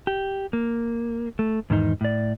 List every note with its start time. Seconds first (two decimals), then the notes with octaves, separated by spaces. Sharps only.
0.07 G4
0.53 A#3
1.39 A3
1.70 E2 G#2 D#3 D#4
2.01 A2 D5